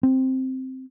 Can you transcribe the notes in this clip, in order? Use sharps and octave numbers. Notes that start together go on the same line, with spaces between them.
C4